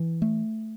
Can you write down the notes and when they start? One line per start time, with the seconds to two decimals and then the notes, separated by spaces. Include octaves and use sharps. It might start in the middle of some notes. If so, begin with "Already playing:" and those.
Already playing: E3
0.22 A3